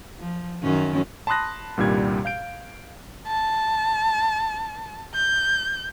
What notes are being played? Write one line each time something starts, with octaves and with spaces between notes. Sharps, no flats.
F3
F#2 D#3 C#4
A5 B5 C6 D#6 F#6 A#6
C2 G2 A#2 D#3 G3 G#6
F5 G6 D7
A5
G6